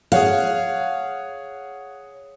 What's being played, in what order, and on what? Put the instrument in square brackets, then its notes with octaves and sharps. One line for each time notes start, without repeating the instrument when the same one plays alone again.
[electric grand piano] G#4 C#5 F#5 [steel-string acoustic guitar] F5